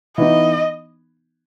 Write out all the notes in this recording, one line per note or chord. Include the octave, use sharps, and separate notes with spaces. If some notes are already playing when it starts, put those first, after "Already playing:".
E3 B3 D#4 D#5